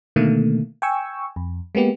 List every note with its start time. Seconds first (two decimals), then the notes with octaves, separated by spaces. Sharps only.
0.16 B2 D3 D#3 A3 A#3
0.82 G5 G#5 C#6 E6
1.36 F2
1.75 G#3 A#3 B3 G4